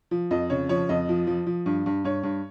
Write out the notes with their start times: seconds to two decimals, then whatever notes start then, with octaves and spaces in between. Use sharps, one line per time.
0.11 F3
0.31 F2 D#5
0.50 C#3 C#5
0.69 F3 C#5
0.89 F2 D#5
1.09 F3
1.27 F3
1.46 F3
1.66 G2
1.86 G2
2.05 G2 C#5
2.23 G2